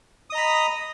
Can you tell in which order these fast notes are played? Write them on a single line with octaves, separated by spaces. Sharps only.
D#6 D#5 A#5 B5